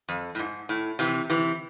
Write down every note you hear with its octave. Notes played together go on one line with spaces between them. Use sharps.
F2
A2
G#2
A2
C3 E3
C3 E3